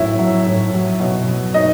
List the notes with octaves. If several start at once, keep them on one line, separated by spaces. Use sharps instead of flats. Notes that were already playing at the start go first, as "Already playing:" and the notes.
Already playing: A2 F#3 E4 E5
F#3
A2
F#3
B2
F#3
B2 D#4 D#5